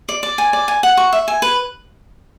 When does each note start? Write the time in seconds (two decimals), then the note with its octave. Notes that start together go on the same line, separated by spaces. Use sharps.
0.09 D5
0.23 D5
0.38 G#5
0.53 D5
0.68 G#5
0.83 F#5
0.97 C#6
1.13 E5
1.28 G#5
1.42 B4